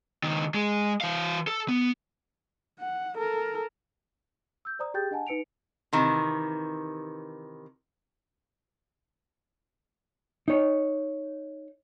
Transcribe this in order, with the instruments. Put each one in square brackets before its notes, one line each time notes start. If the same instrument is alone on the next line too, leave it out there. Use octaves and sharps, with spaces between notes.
[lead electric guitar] C#2 D#3
G#3
E3 F5
A4
B3
[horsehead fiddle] F#5
A4 A#4
[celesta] E6 G6
C5 D5 A#5 D#6
G4 G#4 G5 G6 A6
D4 D#5 F#5 G#5 A5
D#4 B4 C#7 D7 F7
[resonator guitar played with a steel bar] C3 D#3 E3
[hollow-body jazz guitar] D#4 C#5